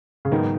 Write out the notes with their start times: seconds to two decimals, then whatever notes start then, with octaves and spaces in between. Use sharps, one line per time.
0.25 C#3
0.31 G#2 D#3 F#3 B3 D#4 A#4